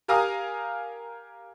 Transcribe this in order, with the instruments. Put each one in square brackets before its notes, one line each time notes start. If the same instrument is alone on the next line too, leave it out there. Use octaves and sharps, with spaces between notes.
[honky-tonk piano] G4 A#4 F5 G#5 A#5 D#6